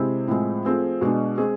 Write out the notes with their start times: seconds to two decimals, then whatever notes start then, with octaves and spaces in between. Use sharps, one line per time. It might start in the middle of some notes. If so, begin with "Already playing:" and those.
Already playing: C3 G#3 C4 E4 G#4
0.28 A2 F3 G#3 C4
0.65 F3 A3 C4 G#4
1.01 B2 G#3 B3 D4
1.38 G#3 C4 G#4